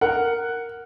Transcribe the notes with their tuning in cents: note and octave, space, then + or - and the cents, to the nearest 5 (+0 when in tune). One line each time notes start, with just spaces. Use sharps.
A#4 -5 F#5 +0